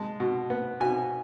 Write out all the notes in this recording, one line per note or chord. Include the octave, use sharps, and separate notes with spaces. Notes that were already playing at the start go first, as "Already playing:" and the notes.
Already playing: G#3 A5
B2
B3
B2 G#5